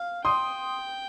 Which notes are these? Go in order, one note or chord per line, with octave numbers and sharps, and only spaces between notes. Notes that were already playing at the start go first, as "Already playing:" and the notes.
Already playing: F5
G5 C6 D#6